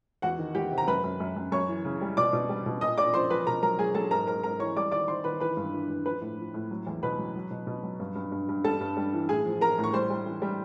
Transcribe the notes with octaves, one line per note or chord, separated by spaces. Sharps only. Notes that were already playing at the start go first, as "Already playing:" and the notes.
E2 F#4 F#5
D#3
E2 G4 G5
C3
A#5
F#2 B4 B5
F#2
F#2
F#2
F#2 C#5 C#6
E3
C#3
G3
B2 D5 D6
B2
G3
B2
A#2 D#5 D#6
A#2 D5 D6
F3 C5 C6
F3 B4 B5
B2 A#4 A#5
F#3 A#4 A#5
F#3 G#4 G#5
F#3 A4 A5
G#2 A#4 A#5
G#2 A#4 A#5
G#2 A#4 A#5
E3 C#5 C#6
G3 D5 D6
D#3 D5 D6
D#3 C5 C6
D#3 B4 B5
E3 B4 B5
G2
E3
G2
F3 B4 B5
A2
F3
A2
F#3
E2
B2 B4 B5
F#3
F#3
B2
B2
F#3
G2
G2
G2
G2
G3 A4 A5
G2
G3
E3
A2 G#4 G#5
F3
F3 A#4 A#5
A2
C#6
G3 C5 C6
G3
E3
G3